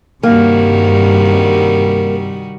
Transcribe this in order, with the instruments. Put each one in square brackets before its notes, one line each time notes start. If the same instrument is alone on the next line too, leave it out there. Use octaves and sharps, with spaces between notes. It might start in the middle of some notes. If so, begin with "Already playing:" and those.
[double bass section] G2 C3 [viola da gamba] D#3 G3 F#4 [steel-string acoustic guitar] A#3